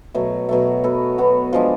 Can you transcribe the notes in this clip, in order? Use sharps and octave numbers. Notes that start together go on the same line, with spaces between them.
B2 F#3 A3
B2 F#3 A3
B3 F#4 A4
B3 F#4 A4
F3 G#3 D4